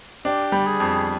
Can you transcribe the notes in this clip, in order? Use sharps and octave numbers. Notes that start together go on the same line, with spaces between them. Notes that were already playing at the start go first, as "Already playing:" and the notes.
D4 G4
G3
G#4
F2